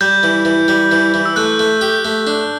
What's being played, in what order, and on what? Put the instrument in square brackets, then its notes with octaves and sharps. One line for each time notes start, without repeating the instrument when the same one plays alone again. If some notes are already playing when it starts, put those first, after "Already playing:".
[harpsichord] G3 [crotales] G6
[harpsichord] E3
E3
G3
E3
E3
[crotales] E6
[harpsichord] A3 [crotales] F#6
[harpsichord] A3
G4
A3
D4